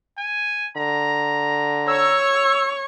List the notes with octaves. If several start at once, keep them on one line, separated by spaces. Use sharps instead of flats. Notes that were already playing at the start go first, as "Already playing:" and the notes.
G#5
D3 A#5
C#5 C#6 E6